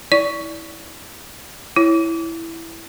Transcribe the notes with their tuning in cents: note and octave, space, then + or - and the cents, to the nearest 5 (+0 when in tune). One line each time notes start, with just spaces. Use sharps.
E4 -25 D5 -25
E4 +0 C#5 +0